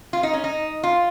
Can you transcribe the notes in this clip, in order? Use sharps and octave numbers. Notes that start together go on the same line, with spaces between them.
F4
D#4
C#4
D#4
F4